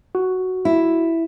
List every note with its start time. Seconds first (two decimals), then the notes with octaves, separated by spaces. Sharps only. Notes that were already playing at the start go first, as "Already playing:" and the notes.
0.15 F#4
0.65 E4